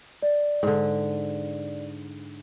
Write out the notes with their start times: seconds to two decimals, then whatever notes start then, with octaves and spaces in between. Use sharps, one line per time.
0.22 D5
0.63 G#2 D3